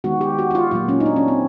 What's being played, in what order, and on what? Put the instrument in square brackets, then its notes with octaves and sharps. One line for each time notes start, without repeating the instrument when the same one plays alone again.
[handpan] D#3 G#3 B3 F#4
G4
F#4
F#4
F4
A#2 F#3 A#3 F4
C#4
D#4
D4
C#4
C4